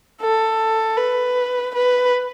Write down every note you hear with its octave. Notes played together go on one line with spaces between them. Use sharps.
A4
B4
B4